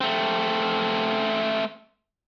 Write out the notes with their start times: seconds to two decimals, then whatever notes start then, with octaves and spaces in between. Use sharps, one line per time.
0.01 A3 C4